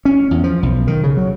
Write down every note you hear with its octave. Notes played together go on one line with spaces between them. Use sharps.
C#4
E2
F3
B1
D#3
C#3
F#3